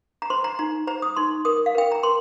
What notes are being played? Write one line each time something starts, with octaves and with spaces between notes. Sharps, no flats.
A#5
C5 C6
A#5
D#4 A#5
C5 A#5
D#6
D#4 C6
A#4 D#6
F5
A#4 G5
A#5
A#4 C6